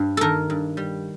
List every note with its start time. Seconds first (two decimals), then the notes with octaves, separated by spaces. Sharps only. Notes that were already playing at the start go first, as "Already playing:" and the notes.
Already playing: G2 G3
0.17 D#3 A4 A#4
0.50 G2
0.77 G3